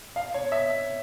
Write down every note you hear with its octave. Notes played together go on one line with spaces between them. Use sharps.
F5
C#5
E5